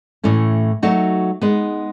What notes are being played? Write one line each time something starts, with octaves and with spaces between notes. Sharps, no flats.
A2 E3 A3 C#4
F#3 A3 D#4 F#4
G#3 B3 D#4